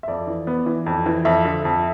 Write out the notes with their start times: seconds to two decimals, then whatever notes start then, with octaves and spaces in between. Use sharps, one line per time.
0.03 E5
0.08 F2 D5
0.27 E3
0.47 B3
0.66 E3
0.86 F2
1.06 E3
1.25 F2 E5
1.45 D3
1.65 F2